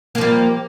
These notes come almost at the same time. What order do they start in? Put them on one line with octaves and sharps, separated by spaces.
A#3 F3 G3